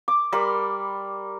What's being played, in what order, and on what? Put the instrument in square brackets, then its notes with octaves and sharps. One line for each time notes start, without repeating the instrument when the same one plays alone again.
[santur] D6
G3 A#4 B5 C6